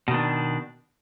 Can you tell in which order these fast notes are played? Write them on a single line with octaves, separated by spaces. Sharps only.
B2 D#3 D4